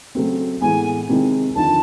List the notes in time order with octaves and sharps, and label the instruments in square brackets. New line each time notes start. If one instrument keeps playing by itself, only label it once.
[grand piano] C#3 F#3 A3 C4
[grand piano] A2 E3 G#3 B3 [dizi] G#5
[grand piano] C3 D#3 G#3 C4 E4
[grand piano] D#2 D3 F3 [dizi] A5